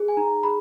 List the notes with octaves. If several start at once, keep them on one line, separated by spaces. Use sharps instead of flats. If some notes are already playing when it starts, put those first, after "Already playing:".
Already playing: G#4
G#5
D#4 A#5
G#4 B5